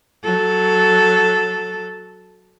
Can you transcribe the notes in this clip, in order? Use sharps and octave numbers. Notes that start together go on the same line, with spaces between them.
F#3 A4